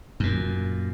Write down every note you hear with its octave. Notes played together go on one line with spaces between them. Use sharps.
F#2 A#2